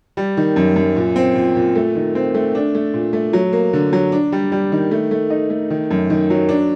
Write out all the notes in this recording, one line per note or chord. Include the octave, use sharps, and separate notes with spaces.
G3
D#3
F#2
F#2
A#2
C4
A#2
A#2
A3
D#3
C4
A3
D4
A3
A#2
A3
F#3
A#3
D3
F#3
D4
G3
G3
D#3
A3
A3
D#4
A3
D#3
F#2
D#3
F#3
D4